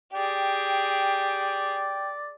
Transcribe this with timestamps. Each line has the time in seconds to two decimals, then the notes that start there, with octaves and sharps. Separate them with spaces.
0.14 G4 G#4 D5 G5